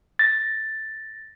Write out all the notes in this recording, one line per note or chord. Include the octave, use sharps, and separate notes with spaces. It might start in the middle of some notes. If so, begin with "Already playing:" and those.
A6 A#6